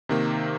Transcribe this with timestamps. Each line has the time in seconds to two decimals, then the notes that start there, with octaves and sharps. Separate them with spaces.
0.09 C3 D#3 A#3